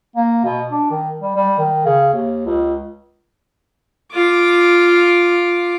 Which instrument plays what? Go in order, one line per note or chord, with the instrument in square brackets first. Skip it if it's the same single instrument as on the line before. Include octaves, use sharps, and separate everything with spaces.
[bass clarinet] A#3
B2
D4
D#3
G3
G3
D#3
C#3
D#2
C#2
[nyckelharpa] F4 D6